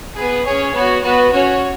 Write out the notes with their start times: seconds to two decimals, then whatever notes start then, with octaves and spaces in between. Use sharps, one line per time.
0.15 B3 G#4 B4
0.45 C#4 G#4 C#5
0.74 B3 F#4 C#5
1.03 B3 F#4 B4
1.32 C#4 F#4 C#5